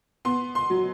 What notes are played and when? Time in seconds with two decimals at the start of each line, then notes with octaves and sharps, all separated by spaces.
0.25 B3 C6
0.55 C6
0.70 F#3